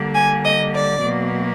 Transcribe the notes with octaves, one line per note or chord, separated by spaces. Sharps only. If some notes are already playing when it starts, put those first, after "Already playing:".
Already playing: D3 G3 A#3
G#5
D#5
D5
B2 F#3 A#3